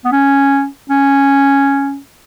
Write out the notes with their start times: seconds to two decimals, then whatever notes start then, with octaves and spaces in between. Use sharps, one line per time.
0.05 B3
0.12 C#4
0.90 C#4